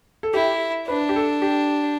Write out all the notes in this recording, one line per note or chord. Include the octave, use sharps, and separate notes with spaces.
A4
E4 G4
D4 B4
G4
A4
G4